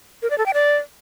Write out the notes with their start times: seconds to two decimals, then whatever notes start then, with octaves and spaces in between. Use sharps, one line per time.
0.22 A#4
0.30 D5
0.38 A4
0.46 G5
0.54 D5